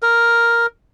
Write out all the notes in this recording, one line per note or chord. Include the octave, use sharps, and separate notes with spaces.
A#4